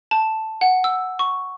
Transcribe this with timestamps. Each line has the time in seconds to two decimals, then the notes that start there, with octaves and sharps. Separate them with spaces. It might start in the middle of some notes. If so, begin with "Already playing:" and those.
0.11 A5
0.61 F#5
0.84 E6
1.19 C#6